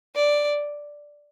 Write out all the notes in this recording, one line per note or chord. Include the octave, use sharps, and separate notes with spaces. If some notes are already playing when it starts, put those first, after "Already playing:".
D5